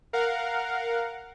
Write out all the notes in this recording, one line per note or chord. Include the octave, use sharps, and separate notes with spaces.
A#4 F5 F#5